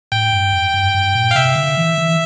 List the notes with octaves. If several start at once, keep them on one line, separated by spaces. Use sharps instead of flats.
A2 G5
G2
F2
G2
G2
A#2
F5
C3 E5
D3
E3
E3